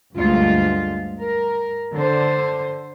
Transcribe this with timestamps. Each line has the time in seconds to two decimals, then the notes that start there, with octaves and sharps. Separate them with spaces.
0.16 D2 G2 G#3 F4
1.22 A#4
1.93 D3 C5